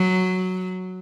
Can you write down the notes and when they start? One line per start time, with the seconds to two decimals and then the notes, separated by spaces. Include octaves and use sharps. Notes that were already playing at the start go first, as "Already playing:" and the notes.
Already playing: F#3